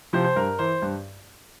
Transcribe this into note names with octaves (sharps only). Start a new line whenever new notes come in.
C3 F3 C5
C5
G2 A#4
E3 C5
G2